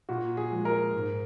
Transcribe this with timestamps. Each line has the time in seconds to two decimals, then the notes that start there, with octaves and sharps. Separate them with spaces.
0.09 A#2 F#4
0.37 G#4
0.52 F3 G#3
0.65 A#4
0.94 G#2